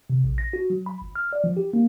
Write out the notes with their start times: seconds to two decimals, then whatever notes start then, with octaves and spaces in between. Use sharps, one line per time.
0.10 C3
0.24 A#1
0.38 A#6
0.53 F#4
0.70 F#3
0.86 B5
1.02 G1
1.15 F6
1.33 D5
1.44 F3
1.57 G4
1.73 A#3